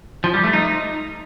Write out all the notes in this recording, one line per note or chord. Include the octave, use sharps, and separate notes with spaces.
F3
G3
A3
D#4